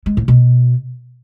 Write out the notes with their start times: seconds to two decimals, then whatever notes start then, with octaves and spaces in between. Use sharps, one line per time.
0.06 G#3
0.17 A2
0.28 B2